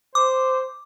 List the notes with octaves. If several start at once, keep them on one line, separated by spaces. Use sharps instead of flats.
C5 D6